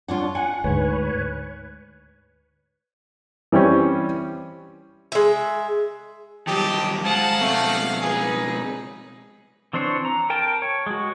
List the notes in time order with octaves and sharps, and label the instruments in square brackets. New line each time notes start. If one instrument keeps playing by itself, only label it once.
[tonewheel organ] D4 [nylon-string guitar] F4 C#5 F#5
[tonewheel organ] F#5 [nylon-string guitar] G#5
[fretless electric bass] D2 G#2 [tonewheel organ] B4 C#5
[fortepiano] E3 G3 C4 C#4
[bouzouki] G#3 E5
[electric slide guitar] D#3 F#3 G3 [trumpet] G4 [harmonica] D#5 A5
[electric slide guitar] G#3 C5 [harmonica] F5 [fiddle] F#5 [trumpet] A5
[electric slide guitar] B2 G#3 C4 [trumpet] A3
[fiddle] D#4 B4 [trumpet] G#4
[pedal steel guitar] E3 C4 D4 C5 C#5
A#5
A#4 G5 A5
C#5
G#3 F#4